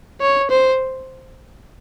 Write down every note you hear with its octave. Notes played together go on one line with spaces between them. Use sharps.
C#5
C5